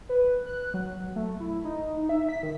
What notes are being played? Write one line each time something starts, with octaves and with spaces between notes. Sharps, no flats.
B4
F#6
F#3
A3
E4
D#4
E5
B6
D#3